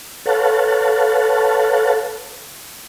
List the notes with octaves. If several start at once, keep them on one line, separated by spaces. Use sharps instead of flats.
A4 B4 C#5 F5 F#5 A5